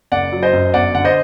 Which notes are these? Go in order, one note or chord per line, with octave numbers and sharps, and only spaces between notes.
F#1 D5 F#5
F#3
C5 D#5
F#2
G1 D5 F#5
D3 F#5
C5 D#5